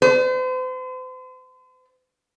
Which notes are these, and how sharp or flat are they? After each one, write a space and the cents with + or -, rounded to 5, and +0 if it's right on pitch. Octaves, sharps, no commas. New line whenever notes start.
C5 -40